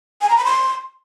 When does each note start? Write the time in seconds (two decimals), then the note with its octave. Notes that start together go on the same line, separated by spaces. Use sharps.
0.21 G#5
0.29 A#5
0.37 B5
0.45 C6